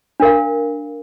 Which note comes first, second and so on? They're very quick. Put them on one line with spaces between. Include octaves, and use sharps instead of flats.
D4 A#4 F5